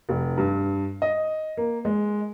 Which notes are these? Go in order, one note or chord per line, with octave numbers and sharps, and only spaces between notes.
F1
G2
D#5
A#3
G#3